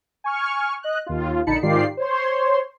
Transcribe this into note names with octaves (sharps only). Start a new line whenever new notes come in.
G#5 C#6 F6
D#5 F#6
D#2 F4
A#1 D3 D#4 A5 B5 C#7
G#2 D#3 F4 G4 D5 C7
C5 C#5 C6